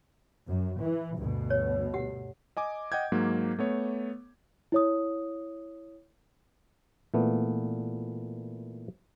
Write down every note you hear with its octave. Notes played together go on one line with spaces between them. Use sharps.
F#2
E3
D2 G2 B2
C#5
G4 F#5
D#5 G#5 D6
D#5 F#5 G5 G6 G#6
G#2 F#3 A#3
A3 B3 C#5
E4 C#5 D#6
A#2 E3 A3 B3